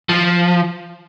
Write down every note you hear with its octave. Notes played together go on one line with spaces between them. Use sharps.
F3